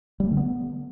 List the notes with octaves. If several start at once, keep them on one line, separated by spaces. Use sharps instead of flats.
G3
A3
D3
B3